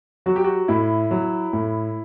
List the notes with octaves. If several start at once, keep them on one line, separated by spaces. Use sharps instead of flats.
F#3 F#4
G4
F#4
A2 E4
F#3
A2